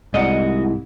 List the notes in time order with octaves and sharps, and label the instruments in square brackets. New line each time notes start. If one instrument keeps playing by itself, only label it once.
[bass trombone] C2 [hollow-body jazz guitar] G#2 [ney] E4 [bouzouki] F#4 D#5